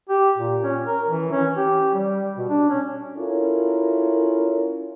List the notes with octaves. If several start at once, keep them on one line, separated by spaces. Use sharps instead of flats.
G4
A#2
C#4
A#4
E3
C#4
G4
G3
B2
D4
C#4
C#4 E4 F4 A4 A#4